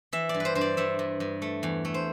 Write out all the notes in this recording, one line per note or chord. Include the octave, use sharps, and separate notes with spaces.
E3 E5
D5
G2
B4 C5
G2 C5
D5
G2 E5
G2
G2
A3
E2
A3
C5